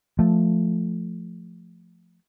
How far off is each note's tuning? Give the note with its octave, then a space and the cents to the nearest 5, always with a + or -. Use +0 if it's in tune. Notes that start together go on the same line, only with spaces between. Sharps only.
F3 +0 A3 +0